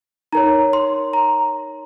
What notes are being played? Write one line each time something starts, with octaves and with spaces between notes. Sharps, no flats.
D#4 A#4 C#5 A#5
C6
A#5